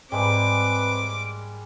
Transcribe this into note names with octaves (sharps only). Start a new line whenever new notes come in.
G#2 G3 G#3 A#3 C4 B4 D6